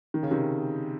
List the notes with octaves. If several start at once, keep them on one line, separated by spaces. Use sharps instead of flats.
D#3
C#3
C3 D#3